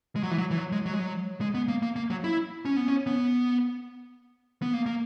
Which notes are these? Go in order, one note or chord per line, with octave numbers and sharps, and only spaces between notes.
G#3
F#3
E3
F#3
E3
F#3
G#3
F#3
G#3
F#3
G#3
B3
A#3
A#3
A#3
F#3
E4
C#4
B3
C#4
B3
B3
A#3
A#3